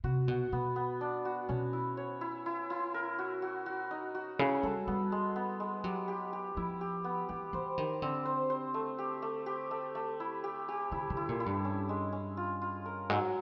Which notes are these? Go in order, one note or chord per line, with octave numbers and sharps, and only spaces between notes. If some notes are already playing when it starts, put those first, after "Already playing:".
C3 F#4
B2 F#4
B2 B3
B3
D4
F#4
B2 C#4
E4
C#5
E4
E4
E4
A#4
F#4
F#4
F#4
D#4
F#4
C#3 E4
G3 A4
G3 B3
G#3
B3
G#3
F#3 G4
G4
G4
F3 E4
G4
B3
E3 G4
E3 C5
D#3 G4
D3 C4
C5
C5
A3
G4
A3
G4
A3
A3
E4
G4
G4
D3 E4
D3
E4
A#2
E4
G2
C#4
G#3
C#4
F4
F4
A#4
G#2 F#3